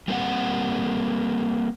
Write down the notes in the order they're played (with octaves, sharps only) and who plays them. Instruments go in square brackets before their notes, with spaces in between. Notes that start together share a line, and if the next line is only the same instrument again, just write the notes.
[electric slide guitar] G3 A#3 C4 G4 F#5